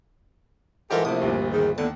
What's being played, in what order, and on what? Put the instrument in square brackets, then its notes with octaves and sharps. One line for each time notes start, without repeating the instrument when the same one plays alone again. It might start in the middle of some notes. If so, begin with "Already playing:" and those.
[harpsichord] G#2 E3 A#4 [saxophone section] F4 G4 A4
[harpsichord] A#1 D#6 [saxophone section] A2 C3
[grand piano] D2 G2 A#2 [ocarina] G4
[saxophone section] D#3 [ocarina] G#4
[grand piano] D#2 [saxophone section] A2 D3 [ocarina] B3 [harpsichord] A5